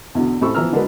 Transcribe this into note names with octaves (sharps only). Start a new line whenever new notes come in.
E2 B2 D3
A1 C4 A4 B5 C#6 E6
E3 F3 B3 A#5 E6 F6
D3 G#3 D4 F#4 A#4 B4